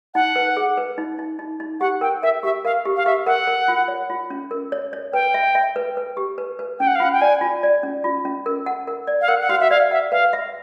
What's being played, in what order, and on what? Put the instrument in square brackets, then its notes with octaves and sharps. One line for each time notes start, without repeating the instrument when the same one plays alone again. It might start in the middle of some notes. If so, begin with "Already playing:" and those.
[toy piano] D#4 [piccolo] F#5
[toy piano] B4
G#4
B4
D#4
D#4
D#4
D#4
[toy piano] G4 [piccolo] F#5
[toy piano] A#4 [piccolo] G5
[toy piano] A#4 [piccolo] E5
[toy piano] G4 [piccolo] E5
[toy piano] A#4 [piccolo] F5
[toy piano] G4
[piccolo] F5
[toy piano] G4 [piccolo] E5
[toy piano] A#4 [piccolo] F#5
[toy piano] A#4
F4
C#5
F4
C#4
A#4
C#5
C#5
[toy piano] B4 [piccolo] G5
[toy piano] E5
E5
B4
B4
G4
B4
B4
[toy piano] C#4 [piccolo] G5
[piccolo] F#5
F5
[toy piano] F4 [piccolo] F#5
[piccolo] G5
[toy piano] D5 [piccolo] G#5
[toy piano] F4
D5
C#4
F4
C#4
A#4
F#5
A#4
D5
[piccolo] F5
[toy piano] A#4 [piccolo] F#5
[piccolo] F#5
[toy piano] F#4 [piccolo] F5
[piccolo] E5
[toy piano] D5 [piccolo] F5
[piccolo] E5 [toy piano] F#5
[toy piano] B4 [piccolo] F5
[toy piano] E5